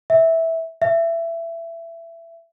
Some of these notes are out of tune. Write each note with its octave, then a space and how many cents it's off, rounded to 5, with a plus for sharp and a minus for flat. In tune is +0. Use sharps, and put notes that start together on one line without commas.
E5 -10
E5 +20